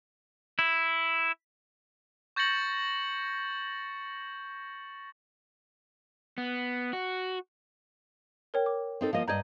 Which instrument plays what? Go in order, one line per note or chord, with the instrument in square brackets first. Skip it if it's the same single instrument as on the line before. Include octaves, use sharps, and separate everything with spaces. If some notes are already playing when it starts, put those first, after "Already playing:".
[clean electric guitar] E4
[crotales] C#6 G6 A6 A#6 C#7 F#7
[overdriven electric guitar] B3
F#4
[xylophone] A#4 C#5 G5
D6
[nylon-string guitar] C4 D#4 A4
F3 A#3 D#5
[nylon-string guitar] G2 D5 D#5 [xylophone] A#5 G6 G#6